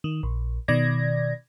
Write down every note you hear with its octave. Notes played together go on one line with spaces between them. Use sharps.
D#3
A#1
B2 D#3 D5 G#6 A#6